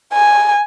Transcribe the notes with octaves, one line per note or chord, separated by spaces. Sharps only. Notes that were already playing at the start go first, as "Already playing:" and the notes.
G#5